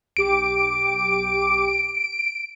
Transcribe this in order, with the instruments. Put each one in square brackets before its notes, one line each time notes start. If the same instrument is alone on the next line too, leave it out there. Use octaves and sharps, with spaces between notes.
[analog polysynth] B1 G4 D6 [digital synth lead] D7